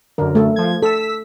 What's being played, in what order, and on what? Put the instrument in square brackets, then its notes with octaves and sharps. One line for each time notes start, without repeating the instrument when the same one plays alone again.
[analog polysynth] F#2 D3 [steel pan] A#4
[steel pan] A3 A4
[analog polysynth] F3 G#6
[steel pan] A4 [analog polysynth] E6 B6